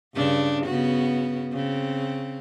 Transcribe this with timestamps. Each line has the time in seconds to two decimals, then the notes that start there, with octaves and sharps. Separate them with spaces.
0.16 G2 C#3 D4
0.66 C#3 B3 F#4
1.53 C#3 C4